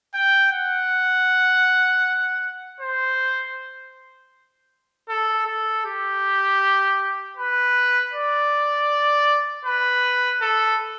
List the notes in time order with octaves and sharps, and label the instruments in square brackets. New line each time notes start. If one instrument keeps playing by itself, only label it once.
[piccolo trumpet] G5
F#5
C5
A4
A4
G4
B4
D5
B4
A4